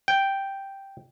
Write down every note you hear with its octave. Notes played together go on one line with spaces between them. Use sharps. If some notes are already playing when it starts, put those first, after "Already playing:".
G5